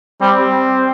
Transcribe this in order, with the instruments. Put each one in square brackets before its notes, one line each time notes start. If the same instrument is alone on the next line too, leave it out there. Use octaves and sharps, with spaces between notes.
[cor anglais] G3 [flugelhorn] C4